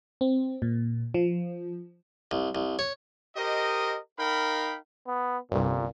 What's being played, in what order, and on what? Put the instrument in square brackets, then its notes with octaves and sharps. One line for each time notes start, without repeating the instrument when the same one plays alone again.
[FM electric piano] C4
A#2
F3
[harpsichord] C2
C2
C#5
[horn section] G4 A#4 C5 D#5
D#4 A#4 F5 G5 B5
[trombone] B3
[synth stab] G1 C2 [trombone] A#2